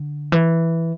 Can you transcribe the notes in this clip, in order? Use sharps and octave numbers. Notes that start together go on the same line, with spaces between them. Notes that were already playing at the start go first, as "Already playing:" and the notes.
Already playing: D3
E3